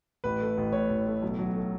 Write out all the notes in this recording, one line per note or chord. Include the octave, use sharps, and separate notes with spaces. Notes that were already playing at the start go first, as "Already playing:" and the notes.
A1 B4
A3
A1
A2 C#5
A1
A3
B1
F#3
A3